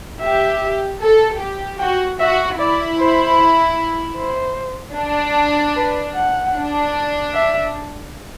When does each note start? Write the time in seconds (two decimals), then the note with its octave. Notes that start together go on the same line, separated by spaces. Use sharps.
0.21 G4 E5
1.01 A4
1.40 G4
1.79 F#4 G5
2.19 F#4 E5
2.58 E4 D5
2.99 C5
4.17 C5
4.96 D4
5.76 B4
6.15 F#5
6.55 D4
7.34 E5